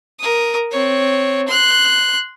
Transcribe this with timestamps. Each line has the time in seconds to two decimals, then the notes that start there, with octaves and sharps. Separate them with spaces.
0.20 A#4 D#6
0.71 C4 C#5
1.48 C6 F#6